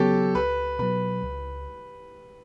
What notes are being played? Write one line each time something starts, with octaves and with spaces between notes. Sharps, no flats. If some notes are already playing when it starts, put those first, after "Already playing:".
Already playing: C#3 F#3 B3 G4 A4 C#5
C#2 B4
B2 F#3 B4
C#2